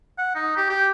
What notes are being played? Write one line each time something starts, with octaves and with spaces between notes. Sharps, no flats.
F#5
D#4
G4
G4